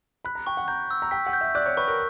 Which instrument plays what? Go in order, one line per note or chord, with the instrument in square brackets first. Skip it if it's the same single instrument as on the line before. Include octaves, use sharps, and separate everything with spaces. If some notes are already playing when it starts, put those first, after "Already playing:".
[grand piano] B5 [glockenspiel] F#6
[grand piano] A#5
[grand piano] G5 [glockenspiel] C#6
[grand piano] F#5
[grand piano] A#5 [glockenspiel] G6
[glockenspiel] E6
[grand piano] A#5
[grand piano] G5 [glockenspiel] B6
[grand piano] F#5
[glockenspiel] G6
[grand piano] E5
[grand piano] D5 [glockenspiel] F#6
[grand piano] C#5
[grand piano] B4 [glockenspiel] C#6
[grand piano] A#4